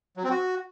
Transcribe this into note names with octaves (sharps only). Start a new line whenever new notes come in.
F#3
C4
F#4